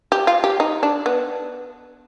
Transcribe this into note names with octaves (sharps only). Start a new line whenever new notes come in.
G4
F4
G4
D#4
D4
B3